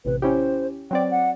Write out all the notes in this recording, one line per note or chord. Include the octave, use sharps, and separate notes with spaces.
A1 C3 B4
C#4 E4 G4 C5
F#3 C4 D5 G5
F#5